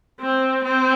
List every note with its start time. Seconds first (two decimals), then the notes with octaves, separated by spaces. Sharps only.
0.20 C4
0.65 C4